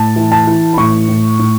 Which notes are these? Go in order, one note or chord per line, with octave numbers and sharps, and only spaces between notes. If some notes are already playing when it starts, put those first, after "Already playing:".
Already playing: A2 A5
E3
A5
E3
B5
A2 C#6
A2
A2